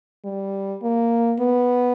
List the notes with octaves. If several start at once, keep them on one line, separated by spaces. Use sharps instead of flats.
G3
A#3
B3